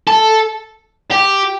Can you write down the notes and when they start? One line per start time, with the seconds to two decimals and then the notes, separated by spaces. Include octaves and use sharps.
0.07 A4
1.11 G4